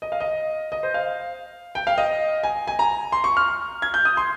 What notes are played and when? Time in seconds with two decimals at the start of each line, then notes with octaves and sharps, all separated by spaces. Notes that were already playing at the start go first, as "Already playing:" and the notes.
0.02 D#5
0.12 F5
0.20 D#5
0.72 D#5
0.83 C5
0.94 F5
1.75 G5
1.87 F5
1.98 D#5
2.43 G#5
2.67 G#5
2.79 A#5
3.12 C6
3.24 C#6
3.37 F6
3.82 G#6
3.94 G6
4.05 D#6
4.17 C6